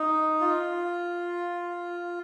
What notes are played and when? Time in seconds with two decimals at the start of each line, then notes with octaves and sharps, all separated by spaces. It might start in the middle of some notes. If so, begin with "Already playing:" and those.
Already playing: D#4
0.41 F4